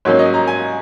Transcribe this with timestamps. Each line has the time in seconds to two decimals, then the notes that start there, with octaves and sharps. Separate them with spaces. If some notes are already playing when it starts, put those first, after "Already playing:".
0.05 G#2 F#3 A#3 C#4 C#5
0.19 D#5
0.34 A#5
0.48 G#5